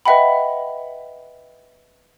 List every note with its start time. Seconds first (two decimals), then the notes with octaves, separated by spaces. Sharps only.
0.05 B4 D#5 E5 F#5 G5 B5